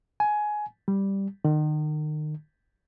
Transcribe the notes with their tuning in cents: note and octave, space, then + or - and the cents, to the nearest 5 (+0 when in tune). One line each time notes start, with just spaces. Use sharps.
G#5 +15
G3 +0
D#3 -35